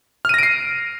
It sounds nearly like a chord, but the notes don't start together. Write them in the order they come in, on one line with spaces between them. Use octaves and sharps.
F6 D#7 A#6 D7 C7